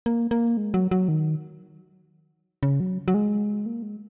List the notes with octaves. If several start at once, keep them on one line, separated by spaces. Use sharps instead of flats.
A#3
A#3
G#3
F#3
F#3
D#3
C#3
F#3
F#3
G#3
A#3
G#3